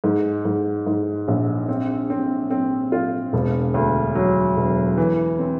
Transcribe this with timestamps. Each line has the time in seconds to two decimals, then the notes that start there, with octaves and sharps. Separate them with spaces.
0.04 G#2
0.45 G#2
0.87 G#2
1.28 A#1
1.68 C4
2.10 C4
2.50 C4
2.92 F4
3.33 E1
3.74 D2
4.15 F#3
4.57 E1
4.98 E3
5.39 C4